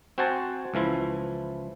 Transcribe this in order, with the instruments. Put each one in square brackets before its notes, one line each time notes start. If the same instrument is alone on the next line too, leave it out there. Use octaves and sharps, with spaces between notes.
[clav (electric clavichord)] C4 F#4 C5 F#5 G#5 A5
C#2 E3 F3 E4